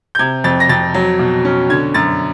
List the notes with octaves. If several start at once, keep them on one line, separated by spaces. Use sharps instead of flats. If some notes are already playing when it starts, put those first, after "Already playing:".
G6
C3 G#6
F2 A6
A#6
F2 A6
F#3
B2
C#4
D3 G#6
F#2 A6